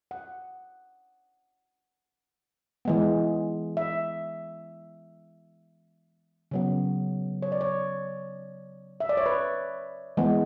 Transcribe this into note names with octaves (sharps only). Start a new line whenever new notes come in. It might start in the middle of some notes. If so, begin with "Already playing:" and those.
F#5
E3 G#3 B3
E5
C#3 F#3 B3
C#5
D5
C#5
E5
D5
C#5
B4
E3 G#3 B3